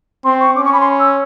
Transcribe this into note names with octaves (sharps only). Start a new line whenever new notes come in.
C4 C6
C#6
C#4 D6
C#6
B5
C6
E6